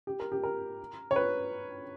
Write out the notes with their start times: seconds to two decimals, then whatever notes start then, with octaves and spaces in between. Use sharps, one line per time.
0.07 G4
0.20 A#4
0.32 G4
0.43 A#4
1.11 C#5
1.16 B4